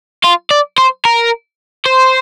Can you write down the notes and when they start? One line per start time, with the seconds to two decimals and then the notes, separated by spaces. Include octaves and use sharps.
0.24 F4
0.51 D5
0.78 C5
1.05 A#4
1.86 C5